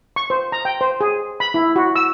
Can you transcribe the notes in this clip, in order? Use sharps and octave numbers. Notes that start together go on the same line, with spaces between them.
C#6
C5
A#5
G5
C5
G#4
B5
E4
F#4
E6